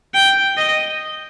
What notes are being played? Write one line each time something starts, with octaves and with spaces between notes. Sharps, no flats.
G5
D#5